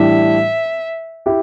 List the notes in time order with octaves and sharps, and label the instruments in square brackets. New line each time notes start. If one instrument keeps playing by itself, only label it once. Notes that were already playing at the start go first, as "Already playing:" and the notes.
Already playing: [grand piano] A2 E3 G3 D4 G4 [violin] E5
[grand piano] E4 G4